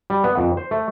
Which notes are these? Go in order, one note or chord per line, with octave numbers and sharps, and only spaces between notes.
G3
B3
F2
C5
A3